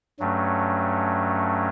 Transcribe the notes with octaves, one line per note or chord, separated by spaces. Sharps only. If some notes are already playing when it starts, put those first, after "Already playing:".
G2 F#3 A3 C#4